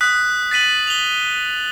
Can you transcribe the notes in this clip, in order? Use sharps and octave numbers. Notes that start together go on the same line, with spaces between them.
D#6 F#6 B6
A6 B6 D#7 F#7
F7 G7